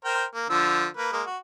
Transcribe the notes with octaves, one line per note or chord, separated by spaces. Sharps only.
A#4 C5 G5
A#3
D3 F3 E6
A#3 B4
G#3 A#3
F#4